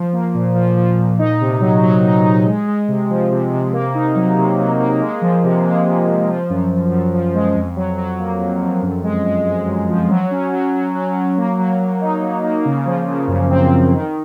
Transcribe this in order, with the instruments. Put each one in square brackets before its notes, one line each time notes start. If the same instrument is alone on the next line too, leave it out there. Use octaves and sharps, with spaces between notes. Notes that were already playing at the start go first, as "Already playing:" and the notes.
Already playing: [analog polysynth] F3
A#3
A#2
F3
F3
A#2
D#4
C3
F#3
F#3
D#4
D#4
G#3
G#3
C3
F3
C3
C3
A#3
D#4
F#3
C3
F#3
A#3
G#3
F3
C3
G#3
C3
C3
F3
F#2
F#2
F#2
F3
G#3
F2
F#3
F#3
A#3
F2
F2
F#2
G#3
G#3
G#3
F#2
F3
F#3
C#4
F#3
F#3
F#3
F#3
A#3
F#3
F#3
D#4
F#3
A#3
C#3
F3
C#3
F#2
C4
F#2
D#3